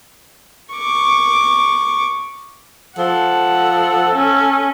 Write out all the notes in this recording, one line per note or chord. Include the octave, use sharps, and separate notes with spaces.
C#6 D6
F3 A4 F#5
C#4